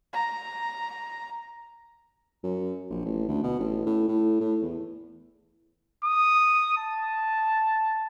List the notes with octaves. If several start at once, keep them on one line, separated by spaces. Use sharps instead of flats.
A#5
F#2
A#1
A1
D2
B2
A1
A2
A2
A2
E2
D#6
A5